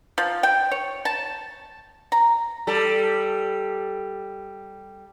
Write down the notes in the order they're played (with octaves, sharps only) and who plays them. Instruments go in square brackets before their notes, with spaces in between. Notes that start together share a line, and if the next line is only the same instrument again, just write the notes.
[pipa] F3
G5
C#5
A5
A#5
[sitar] G3 A4